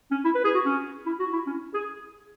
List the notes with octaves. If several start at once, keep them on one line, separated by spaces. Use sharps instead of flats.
C#4
E4
B4
G#4
F#4
C#4
E4
F#4
E4
C#4
G#4